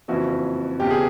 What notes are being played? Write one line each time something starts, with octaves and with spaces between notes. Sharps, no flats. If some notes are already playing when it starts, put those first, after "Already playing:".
F#1 F2 C#3 E3 F#4
E1 E2 C#3 G4
G#4